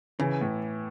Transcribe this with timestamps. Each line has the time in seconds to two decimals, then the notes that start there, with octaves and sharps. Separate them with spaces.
0.20 C#3 E3
0.41 A2